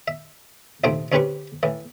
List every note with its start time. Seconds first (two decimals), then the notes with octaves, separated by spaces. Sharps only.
0.08 E5
0.84 A#1 D#2 C3 A3 C5 G5
1.12 D2 C4 C#4 G4 B4 C#6
1.63 A2 E3